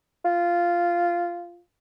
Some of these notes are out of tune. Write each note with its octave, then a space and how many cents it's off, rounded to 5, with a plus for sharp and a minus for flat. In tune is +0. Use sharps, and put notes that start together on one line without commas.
F4 -10